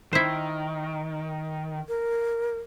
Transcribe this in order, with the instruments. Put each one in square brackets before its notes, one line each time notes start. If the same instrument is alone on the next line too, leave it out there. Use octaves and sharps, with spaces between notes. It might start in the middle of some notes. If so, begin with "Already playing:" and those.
[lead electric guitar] D#3 [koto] E4 C5
[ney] A#4